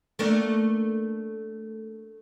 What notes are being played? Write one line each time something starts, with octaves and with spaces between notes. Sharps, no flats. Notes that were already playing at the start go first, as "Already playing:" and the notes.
A3 A#3 D4